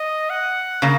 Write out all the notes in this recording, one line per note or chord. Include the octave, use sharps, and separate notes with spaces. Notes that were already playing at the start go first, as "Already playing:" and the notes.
Already playing: D#5
F#5
C#3 A#3